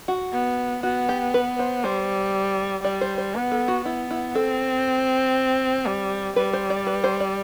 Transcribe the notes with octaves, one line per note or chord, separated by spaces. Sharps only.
F#4
B3
B3 F#4
G4
B4
C5
G3 C5
G3 D5
C5
C5
B3 B4
A4
F#4
B3 E4
E4
C4 A4
G3
G3 B4
C5
D5
B4
C5
D5